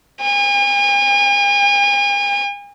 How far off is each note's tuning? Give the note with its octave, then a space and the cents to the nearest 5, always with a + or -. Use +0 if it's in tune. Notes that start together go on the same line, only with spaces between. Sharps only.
G#5 -40